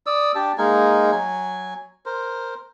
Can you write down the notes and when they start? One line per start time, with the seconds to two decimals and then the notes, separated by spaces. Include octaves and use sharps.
0.06 D5 D#6 E6
0.35 D4 G4 A5
0.58 G#3 A#3 D#4 G#5
1.12 F#3 G#5
2.06 A#4 C5